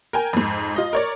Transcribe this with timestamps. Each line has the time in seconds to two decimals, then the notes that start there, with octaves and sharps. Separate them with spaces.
0.13 A#4 G5 G#5
0.33 F2 G#2
0.76 F4 D#5
0.93 A#4 C#5 D5